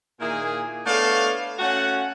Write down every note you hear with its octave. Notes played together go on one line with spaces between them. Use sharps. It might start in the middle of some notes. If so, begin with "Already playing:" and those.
A#2 D#3 A#3 E4 G#4
A3 B3 D4 A4 C#5 F5
A3 C#4 F#4 F#5